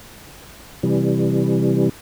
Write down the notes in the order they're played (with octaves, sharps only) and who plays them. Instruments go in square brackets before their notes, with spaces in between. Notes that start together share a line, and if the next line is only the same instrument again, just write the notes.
[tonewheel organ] C3 E3 G3